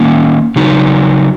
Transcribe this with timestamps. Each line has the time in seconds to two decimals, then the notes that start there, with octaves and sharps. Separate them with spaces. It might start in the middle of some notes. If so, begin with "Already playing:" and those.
Already playing: D#3 A#3 C#4
0.56 C#3 F#3 D#4